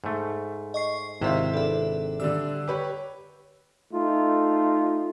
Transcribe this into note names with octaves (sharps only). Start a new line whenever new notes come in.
G#2 A3
D#5 C#6 C7
G#1 C3 E4 C5 E5 F5
D4 A4 B4 E5
D3 G3 D4 E6
G4 B4 C#5
A3 D#4 F4